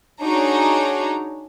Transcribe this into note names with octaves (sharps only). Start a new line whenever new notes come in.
D4 D#4 F#4 G#4 C#5 A#5